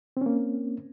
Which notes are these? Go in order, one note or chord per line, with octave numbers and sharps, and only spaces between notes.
A#3 C4 C#4